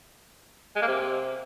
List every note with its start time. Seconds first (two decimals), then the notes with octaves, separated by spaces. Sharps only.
0.76 G#3
0.82 A#3
0.88 C3